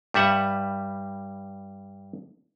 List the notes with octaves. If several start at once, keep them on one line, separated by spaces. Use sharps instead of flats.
G2 G3 E5 F#5